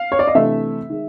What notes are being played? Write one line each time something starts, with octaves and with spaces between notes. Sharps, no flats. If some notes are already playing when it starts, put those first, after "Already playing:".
Already playing: F5
C#5
D5
D#5
C3 E3 A3 D4 E5
D#3 G#3